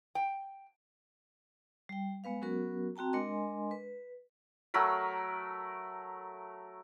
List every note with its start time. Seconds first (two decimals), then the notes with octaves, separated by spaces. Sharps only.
0.15 G5
1.89 G3 G5
2.24 G#3 B3 B4 F5
2.42 F#3 B3 C#4 F#4 A#4
2.96 C4 F#4 G5 A5 A#5
3.13 G#3 D4 A#4 D#5 G#5 C6
3.71 B4
4.74 F#3 A3 A#4 B5